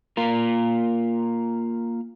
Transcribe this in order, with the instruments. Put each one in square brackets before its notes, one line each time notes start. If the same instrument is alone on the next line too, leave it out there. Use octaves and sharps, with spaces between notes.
[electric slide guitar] A#3 F4 A#4